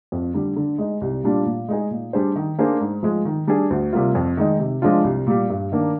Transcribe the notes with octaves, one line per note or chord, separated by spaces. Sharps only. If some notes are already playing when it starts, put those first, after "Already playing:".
F2
D3 G3
D3
G#3 D#4
C2
A#2 G3 D4 F4
A#2
G#3 D#4 G#4
A#2
G3 D4 G#4 C5
D#3
A#3 D4 G#4 C5
G#2
F3 G#3
D#3
G3 D4 G#4
D2
C3 G3 A#3 F4
F2
D#3 G#3 D#4
C3
F3 G#3 D4 F4
C2
A#2 G3
G2
D#3 A#3 D4